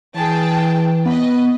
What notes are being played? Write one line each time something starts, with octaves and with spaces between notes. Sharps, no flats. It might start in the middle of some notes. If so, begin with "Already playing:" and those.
E3 G#4 G5 A5
B3 B4 D#5